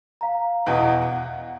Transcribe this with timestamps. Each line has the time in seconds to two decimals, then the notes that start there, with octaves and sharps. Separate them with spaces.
0.21 F5 A#5
0.66 E2 B2 E3
1.01 F#5